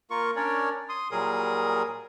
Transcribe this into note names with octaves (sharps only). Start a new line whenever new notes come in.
A#3 F4 A#4 C#6
C#4 D4 A#4 C#5 D5
C6 D#6
A#2 F#3 G3 G#4 A#4 D#6